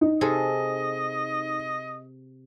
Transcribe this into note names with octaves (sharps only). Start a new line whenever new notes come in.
D#4
C3 G#4 A4 D#5